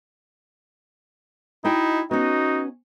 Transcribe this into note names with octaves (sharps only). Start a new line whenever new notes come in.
D#4 E4 F#4 D#5 G5
B3 C#4 D#4 F#4